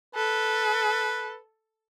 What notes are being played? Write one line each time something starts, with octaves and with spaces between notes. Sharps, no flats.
A4 B4